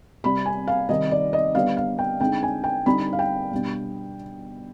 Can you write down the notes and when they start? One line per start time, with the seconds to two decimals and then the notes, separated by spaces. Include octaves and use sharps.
0.24 C3 G3 C4 B5
0.46 G#5
0.68 F5
0.89 C3 D#3 G3 C4 D#4 D#5
1.11 D5
1.33 D#5
1.55 D3 G3 B3 D4 F5
1.77 F5
1.99 G5
2.21 D3 G#3 C4 D#4 G5
2.43 G#5
2.64 G5
2.86 D3 G3 C4 D#4 B5
3.13 F5
3.19 G5
3.51 B2 G3 D4